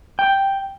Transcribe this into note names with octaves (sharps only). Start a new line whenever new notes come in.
G5